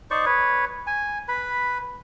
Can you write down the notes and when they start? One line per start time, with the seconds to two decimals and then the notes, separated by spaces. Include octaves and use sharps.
0.11 D#4 C5 D5 C#6
0.26 B4 C#5
0.87 G#5
1.28 B4 B5